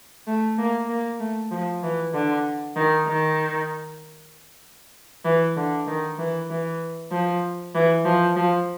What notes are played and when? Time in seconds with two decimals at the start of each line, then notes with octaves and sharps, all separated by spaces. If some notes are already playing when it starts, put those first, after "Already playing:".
0.27 A3
0.58 A#3
0.89 A#3
1.20 A3
1.51 F3
1.83 E3
2.14 D3
2.76 D#3
3.08 D#3
5.25 E3
5.57 D3
5.88 D#3
6.19 E3
6.50 E3
7.12 F3
7.75 E3
8.05 F3
8.36 F3